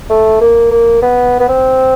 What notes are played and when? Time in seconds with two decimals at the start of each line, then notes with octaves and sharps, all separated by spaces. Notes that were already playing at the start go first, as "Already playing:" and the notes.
0.10 A3
0.41 A#3
0.72 A#3
1.02 B3
1.40 B3
1.49 C4